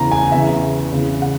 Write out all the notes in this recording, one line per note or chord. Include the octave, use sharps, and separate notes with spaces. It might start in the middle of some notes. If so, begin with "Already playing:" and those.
Already playing: E2 C#3 E3 A#5
G#5
E2 C#3 E3 E5
E2 C#3 E3
F#5